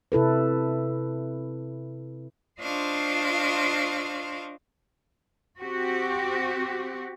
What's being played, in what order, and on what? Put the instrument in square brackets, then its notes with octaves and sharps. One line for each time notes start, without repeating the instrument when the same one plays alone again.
[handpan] C3 E4 A4 B4
[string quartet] D4 F4 C5 D#5 F5 C#6
[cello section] C4 F#4 G4